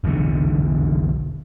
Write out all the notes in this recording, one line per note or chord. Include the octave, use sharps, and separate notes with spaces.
F1 B1 E2 D3